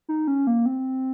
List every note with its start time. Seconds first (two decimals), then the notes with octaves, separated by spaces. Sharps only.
0.09 D#4
0.27 C#4
0.47 A#3
0.66 C4